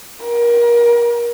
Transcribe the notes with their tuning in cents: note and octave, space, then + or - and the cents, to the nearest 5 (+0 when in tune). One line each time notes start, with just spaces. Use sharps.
A#4 +30